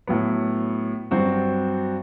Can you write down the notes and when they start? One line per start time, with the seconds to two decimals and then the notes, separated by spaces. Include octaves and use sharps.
0.07 A2 F#3 B3
1.11 G2 F#3 C4 F#4